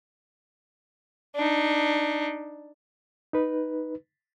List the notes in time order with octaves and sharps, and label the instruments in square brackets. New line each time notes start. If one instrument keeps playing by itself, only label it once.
[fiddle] D4 D#4
[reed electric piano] D#4 B4